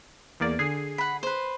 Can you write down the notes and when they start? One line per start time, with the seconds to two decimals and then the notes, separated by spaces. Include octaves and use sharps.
0.40 E2 A#3 D5
0.59 D3 G#4 C7
0.98 F#5 B5
1.23 B4 C5